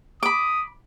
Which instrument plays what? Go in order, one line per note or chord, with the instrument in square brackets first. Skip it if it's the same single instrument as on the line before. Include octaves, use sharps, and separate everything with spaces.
[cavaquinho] B5 D6 [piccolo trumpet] D#6